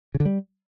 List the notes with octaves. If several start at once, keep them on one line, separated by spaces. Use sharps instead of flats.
C#3
D3
G3